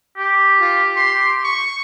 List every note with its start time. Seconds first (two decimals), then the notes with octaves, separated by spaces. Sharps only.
0.17 G4
0.60 F4
0.96 C6
1.44 C#6